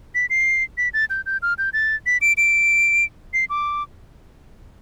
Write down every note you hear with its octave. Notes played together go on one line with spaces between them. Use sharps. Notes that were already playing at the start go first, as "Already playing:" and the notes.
B6
C7
B6
A6
G6
G6
F6
G6
A6
B6
D7
D7
C7
D6